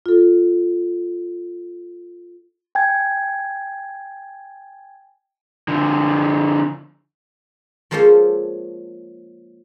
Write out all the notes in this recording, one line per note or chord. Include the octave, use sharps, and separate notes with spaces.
F4 A4
G5 G#5 G#6
D3 F3
F3 G#3 A#3 C#4 A4 C5